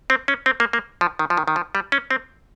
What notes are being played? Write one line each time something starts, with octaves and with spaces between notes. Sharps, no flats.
C4
C#4
C4
A#3
A#3
F3
D#3
F3
D#3
D#3
F3
G3
C#4
C4